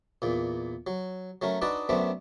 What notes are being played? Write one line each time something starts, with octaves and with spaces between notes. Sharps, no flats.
E2 A#2
F#3
F#3 A3 C#4 A#4
D4 D#4 F#4 B4 D5 D#5
F#2 A3 B3 C4 D4